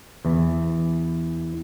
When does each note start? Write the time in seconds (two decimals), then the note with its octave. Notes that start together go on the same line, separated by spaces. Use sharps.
0.25 E2 E3